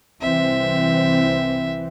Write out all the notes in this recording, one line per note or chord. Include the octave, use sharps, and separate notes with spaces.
C2 E3 C4 E5